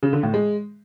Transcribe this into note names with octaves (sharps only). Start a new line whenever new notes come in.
C#3
D3
A2
G#3